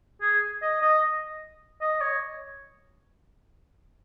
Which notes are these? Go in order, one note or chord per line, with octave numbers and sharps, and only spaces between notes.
G#4
D#5
D#5
D#5
C#5